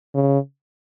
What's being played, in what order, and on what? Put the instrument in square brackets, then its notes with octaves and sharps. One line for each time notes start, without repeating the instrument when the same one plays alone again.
[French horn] C#3